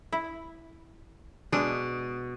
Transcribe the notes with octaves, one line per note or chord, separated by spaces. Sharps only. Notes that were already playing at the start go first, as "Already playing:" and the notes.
E4
B2 G#3 D4